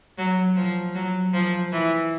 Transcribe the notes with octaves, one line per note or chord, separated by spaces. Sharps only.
F#3
F3
F#3
F3
E3